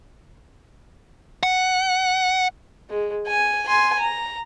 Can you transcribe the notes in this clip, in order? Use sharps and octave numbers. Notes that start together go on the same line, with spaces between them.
F#5
G#3
G#5
G#5 C6
A#5